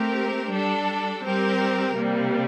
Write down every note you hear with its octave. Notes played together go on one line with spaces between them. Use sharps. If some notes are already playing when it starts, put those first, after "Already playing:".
Already playing: A3 C4 G4 A#4
G3 D4 A4
G3 C4 G4 A#4
C3 G3 A#3